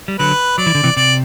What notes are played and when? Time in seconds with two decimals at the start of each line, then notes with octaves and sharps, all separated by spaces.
0.08 G3
0.19 D3 F#3 B4
0.58 F#3 D5
0.66 E3
0.75 D3
0.83 C3 E3
0.96 C3 D5